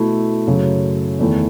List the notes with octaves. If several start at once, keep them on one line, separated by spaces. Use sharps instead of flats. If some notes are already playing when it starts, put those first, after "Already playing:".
Already playing: B2 A3 E4
F#2 C#3 F#3 A3
E2 D#3 A3 E4